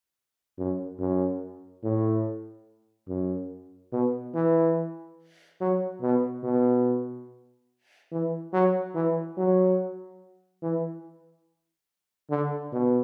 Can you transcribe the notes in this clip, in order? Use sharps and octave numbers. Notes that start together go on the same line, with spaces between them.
F#2
F#2
A2
F#2
B2
E3
F#3
B2
B2
E3
F#3
E3
F#3
E3
D3
B2